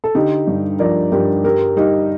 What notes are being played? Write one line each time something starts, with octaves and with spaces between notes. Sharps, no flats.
A4
D3 D#4 G4
G2
F3 A#4 D5
G2 G4 A#4
G3 G4 A#4
G3 D#4 G4